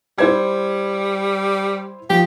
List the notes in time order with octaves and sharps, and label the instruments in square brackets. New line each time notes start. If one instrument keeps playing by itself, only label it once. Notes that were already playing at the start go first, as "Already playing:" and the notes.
[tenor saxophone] G3 [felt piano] E4 C5 G#6
[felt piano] F3 [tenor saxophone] G4